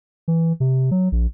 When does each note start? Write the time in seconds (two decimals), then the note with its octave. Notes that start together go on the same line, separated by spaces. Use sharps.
0.28 E3
0.60 C3
0.91 F#3
1.12 A#1